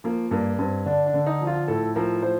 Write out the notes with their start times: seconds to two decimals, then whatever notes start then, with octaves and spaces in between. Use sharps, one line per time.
0.04 F3 A#3
0.31 G2 A#3
0.59 G2 C4
0.86 D3 D4
1.06 D4
1.14 D3
1.27 D#4
1.41 F3
1.47 F4
1.68 A2 A4
1.96 F3 A#4
2.22 F3 C5